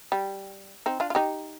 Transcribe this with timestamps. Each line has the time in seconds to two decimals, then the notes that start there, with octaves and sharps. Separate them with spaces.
0.12 G3
0.86 C4 D#4
1.00 D4 F4
1.10 F4
1.15 D#4 G4